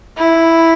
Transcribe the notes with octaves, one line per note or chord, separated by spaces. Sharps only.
E4